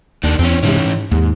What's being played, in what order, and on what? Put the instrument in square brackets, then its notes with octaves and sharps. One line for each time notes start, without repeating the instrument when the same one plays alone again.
[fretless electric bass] D#2 [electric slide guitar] D#3 D4
[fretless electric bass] E2 [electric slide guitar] C4 C#4
[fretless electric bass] G#2 C3 G#3 [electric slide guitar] E3 C#4
[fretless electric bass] G#2
[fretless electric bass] D#2 [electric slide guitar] G#2